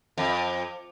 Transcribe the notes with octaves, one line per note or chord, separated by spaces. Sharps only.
F2